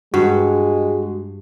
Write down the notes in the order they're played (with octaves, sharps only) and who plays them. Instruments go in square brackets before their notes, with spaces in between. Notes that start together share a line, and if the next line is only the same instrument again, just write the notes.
[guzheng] G2 [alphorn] G#3 [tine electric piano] F#4